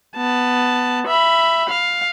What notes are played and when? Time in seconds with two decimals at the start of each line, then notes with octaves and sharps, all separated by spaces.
0.16 B3 A5
1.07 E5 B5
1.69 F5